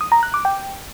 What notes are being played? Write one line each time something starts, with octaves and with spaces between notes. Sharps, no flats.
D#6
A#5
F#6
D6
G5